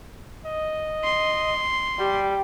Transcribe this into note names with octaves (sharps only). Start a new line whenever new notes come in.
D#5
C6
G3 G4